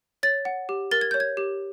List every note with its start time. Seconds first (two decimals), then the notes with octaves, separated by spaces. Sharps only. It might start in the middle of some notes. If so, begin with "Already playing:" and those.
0.23 C#5 A6
0.45 F#5
0.69 G4
0.91 A#4 A6
1.01 G#6
1.11 C#5 G6
1.20 G#6
1.37 G4